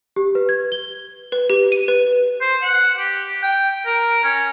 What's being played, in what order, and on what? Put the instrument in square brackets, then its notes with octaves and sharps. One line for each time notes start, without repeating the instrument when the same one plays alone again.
[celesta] G4
B4
G#6
G7
[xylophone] B4
G4
D#7
B4
[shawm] C5
F#5
G4
G5
A#4
C#4